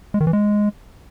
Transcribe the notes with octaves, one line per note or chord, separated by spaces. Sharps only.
G#3
D#3
E3
G#3